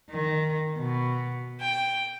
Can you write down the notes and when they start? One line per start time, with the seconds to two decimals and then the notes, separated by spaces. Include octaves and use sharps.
0.10 D#3
0.78 B2
1.61 G5